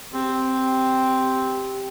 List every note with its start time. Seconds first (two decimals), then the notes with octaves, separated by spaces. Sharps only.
0.14 C4 G4